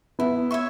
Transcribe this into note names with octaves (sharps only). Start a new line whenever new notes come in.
B3 E4
C#5 E5 C#6